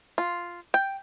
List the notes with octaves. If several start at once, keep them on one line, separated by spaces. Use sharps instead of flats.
F4
G5